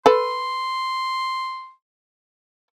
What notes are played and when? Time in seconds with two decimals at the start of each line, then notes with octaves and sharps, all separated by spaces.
0.06 A4 B4 C6